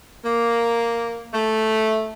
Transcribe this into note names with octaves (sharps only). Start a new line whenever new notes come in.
A#3
A3